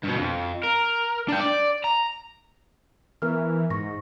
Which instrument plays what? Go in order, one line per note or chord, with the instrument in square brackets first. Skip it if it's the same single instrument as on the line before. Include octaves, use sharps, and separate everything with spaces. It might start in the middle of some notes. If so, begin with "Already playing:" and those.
[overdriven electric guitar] G2 B2
F2
A#4
D4 G5
D5
A#5
[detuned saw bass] E3 [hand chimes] B3 A#4 F6
[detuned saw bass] G#2 [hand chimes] C#6 A#6